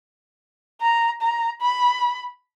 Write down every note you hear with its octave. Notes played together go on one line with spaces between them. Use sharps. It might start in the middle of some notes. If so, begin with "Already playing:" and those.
A#5
A#5
B5